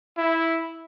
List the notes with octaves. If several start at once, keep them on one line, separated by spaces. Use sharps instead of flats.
E4